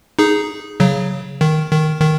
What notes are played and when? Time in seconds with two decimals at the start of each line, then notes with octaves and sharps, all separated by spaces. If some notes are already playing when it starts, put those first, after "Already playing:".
0.19 D#4 G#4
0.80 C#3 F#3
1.41 D#3
1.71 D#3
2.01 D#3